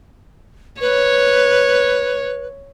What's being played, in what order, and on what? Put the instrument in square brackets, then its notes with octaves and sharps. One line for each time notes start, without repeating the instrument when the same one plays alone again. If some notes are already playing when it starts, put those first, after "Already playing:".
[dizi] B4 [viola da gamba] C#5